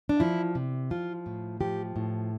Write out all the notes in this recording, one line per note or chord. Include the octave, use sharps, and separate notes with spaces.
D4
F3 E4
C3
F3 F4
A2
F3 G4
A2